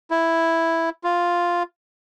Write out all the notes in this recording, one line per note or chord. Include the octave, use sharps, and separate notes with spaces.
E4
F4